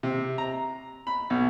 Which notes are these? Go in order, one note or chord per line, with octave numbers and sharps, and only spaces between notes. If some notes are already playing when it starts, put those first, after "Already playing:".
C3
A#5
B5
B1